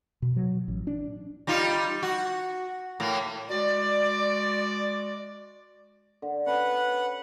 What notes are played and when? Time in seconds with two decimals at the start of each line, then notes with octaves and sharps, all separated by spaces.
0.22 B2
0.36 F#3
0.68 A1
0.87 D4
1.47 G3 D#4 F4
2.03 F#4
3.00 A2 A#3
3.50 G#3 F#4 D5
6.22 D3
6.46 C#4 B4 F#5